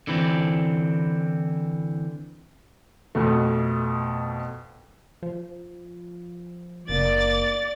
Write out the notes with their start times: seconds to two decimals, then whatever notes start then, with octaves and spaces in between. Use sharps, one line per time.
0.07 D3 E3 C4
3.15 F2 B2 A3
5.23 F3
6.89 F#1 A#3 D5 A6